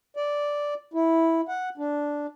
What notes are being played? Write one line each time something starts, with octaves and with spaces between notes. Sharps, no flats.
D5
E4
F#5
D4